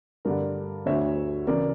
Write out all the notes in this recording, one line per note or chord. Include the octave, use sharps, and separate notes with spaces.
G2 D3 A#4 D5
D2 D3 C#5 E5
C#3 E3 A#4 D5